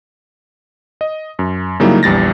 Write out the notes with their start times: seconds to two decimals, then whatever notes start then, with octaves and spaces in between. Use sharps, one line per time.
1.01 D#5
1.39 F#2
1.80 C#3 F#3 G3 A#3 D#4 E4
2.03 A#1 E2 G3 A6 A#6